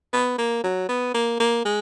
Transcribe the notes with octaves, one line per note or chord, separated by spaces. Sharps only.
B3
A#3
F#3
B3
A#3
A#3
G#3